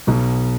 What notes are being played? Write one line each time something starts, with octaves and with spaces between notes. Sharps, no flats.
B1 B2